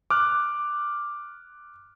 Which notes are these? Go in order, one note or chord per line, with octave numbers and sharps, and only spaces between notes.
D6 F6 F#6